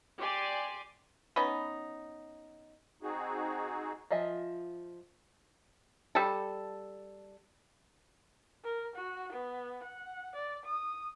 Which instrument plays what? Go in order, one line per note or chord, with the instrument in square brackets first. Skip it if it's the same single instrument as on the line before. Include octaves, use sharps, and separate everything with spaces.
[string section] G4 D5 G#5 C6
[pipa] B3 C#4 D#4
[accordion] C4 D#4 F#4 G#4
[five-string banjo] F3 F4 D#5 E5 G#5
[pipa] G3 A4
[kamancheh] A#4
F#4
B3
F#5
D5
D#6